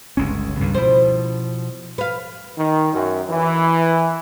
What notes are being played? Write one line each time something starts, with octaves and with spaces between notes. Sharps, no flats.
G1 C#2 C#4
C#2 G2 D#3
B2 F3 E4 C5
B4 F5
D#3
F#2
E3